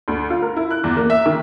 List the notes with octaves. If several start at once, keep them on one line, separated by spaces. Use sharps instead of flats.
D2
F4
A#4
E4
F#6
E2
A#3
E5
D#3